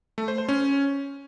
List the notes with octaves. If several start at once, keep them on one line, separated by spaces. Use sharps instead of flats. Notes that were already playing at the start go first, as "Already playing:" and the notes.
A3
C5
C5
C#4